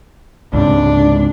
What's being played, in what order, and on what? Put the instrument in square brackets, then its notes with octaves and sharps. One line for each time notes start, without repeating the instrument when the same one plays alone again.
[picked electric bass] C#2 G#2 C3 [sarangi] D4